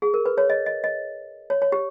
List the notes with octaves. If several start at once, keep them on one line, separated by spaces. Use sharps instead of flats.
G#4
A#4
B4
C#5
D#5
D#5
D#5
C#5
C#5
G4